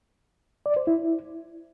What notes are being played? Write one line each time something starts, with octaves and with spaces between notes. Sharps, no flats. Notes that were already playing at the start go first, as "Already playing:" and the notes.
D5
C5
E4